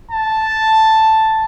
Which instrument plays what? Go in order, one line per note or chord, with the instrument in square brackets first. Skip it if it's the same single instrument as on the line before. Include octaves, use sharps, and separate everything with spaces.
[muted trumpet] A5